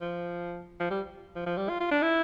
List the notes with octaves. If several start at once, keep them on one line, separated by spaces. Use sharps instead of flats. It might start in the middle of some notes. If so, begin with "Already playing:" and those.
F3
F3
G3
F3
F3
G3
F4
F4
D4
E4